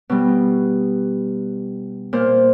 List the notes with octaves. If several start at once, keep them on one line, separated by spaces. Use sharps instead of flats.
B2 G3
A#2 C5 F6